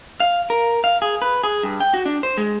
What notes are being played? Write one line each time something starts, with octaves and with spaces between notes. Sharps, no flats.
F5
A#4
F5
G#4
B4
G#4
G2
G5
F#4
D4
C5
G#3